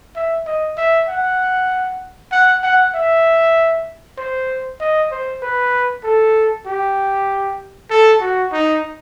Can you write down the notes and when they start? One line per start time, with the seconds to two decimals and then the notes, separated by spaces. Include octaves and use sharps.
0.16 E5
0.46 D#5
0.77 E5
1.08 F#5
2.32 F#5
2.63 F#5
2.95 E5
4.18 C5
4.80 D#5
5.11 C5
5.42 B4
6.03 A4
6.66 G4
7.90 A4
8.21 F#4
8.52 D#4